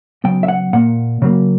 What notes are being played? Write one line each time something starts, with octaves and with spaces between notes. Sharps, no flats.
C#3 F#3 B3 G5
E5
F#5
A#2 A#3 F#5
C#3 F#3 A#3